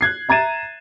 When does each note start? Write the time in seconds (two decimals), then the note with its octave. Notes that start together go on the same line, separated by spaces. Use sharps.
0.01 F#6 G#6 C7
0.29 E5 A#5 G#6 A6 D#7 E7